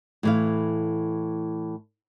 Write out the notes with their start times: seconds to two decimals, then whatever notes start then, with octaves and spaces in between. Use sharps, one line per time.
0.23 A2 E3 F5